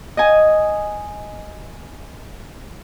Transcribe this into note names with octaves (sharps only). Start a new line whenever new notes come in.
D#5 G#5